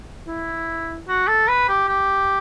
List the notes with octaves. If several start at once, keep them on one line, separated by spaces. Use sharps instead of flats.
E4
F#4
A4
B4
G4
G4